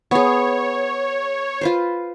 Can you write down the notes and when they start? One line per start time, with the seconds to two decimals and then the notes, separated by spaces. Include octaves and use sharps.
0.11 B3 G#4 C#5
1.61 F4 B4 C5